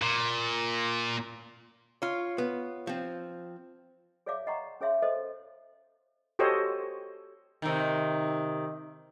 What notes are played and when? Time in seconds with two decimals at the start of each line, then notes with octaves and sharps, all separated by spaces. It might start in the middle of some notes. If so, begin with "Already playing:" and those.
0.02 A#2
2.02 F4 C#5
2.38 B3
2.87 F3 C4
4.26 G#4 C#5 D5 E5 F5 D6
4.47 D#5 F#5 G5 A#5 C6 C#6
4.81 C#4 G#4 C#5 E5 F5 C6
5.02 A4 C5 D#5
6.39 F#4 G4 A4 C5 C#5 D#5
7.62 C3 D#3